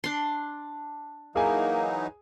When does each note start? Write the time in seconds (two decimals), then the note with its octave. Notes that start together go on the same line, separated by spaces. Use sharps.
0.04 D4 C6
1.36 E3 F#3 A#3 D#4 G#4 G#5